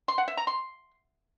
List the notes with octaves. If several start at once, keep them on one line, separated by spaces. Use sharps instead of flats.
C6
F#5
E5
A#5
C6